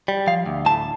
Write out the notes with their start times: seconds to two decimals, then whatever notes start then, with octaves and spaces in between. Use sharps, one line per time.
0.08 G3
0.27 F3 F5
0.46 D2
0.66 A2 A5